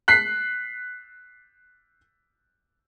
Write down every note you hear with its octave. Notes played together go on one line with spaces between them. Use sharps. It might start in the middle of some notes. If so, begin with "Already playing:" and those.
F#6 B6 C7